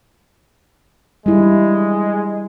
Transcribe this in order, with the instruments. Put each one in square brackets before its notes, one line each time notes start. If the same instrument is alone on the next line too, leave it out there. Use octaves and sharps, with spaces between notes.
[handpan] G3 E4 [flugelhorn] G#3